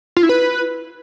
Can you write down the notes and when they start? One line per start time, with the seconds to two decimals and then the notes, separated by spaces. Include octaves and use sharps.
0.17 F4
0.23 E4
0.29 B4